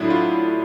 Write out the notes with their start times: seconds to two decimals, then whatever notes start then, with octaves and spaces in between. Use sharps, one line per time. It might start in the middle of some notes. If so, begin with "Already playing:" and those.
Already playing: A2 F#3 D4 E4
0.10 F4